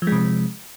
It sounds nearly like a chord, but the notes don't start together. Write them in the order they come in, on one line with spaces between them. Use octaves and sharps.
F3 G#3 C3